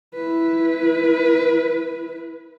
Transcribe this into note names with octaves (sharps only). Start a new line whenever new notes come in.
E4 B4